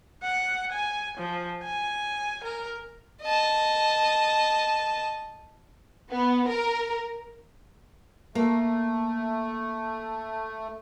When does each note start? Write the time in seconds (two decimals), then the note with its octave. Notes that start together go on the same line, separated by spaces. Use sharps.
0.23 F#5
0.72 G#5
1.18 F3
1.64 G#5
2.44 A#4
3.22 D#5 A5
6.10 B3
6.47 A#4
8.35 A3 A#3